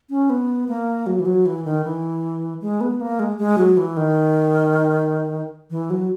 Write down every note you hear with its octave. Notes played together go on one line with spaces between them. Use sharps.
C#4
B3
A#3
F#3
E3
F#3
E3
D#3
E3
G#3
B3
A#3
G#3
G#3
F#3
E3
D#3
E3
F#3